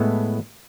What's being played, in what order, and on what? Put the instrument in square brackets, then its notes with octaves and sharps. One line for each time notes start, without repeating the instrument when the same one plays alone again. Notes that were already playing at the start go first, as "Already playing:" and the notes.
Already playing: [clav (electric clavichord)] A2 G#3 B3 E4 A4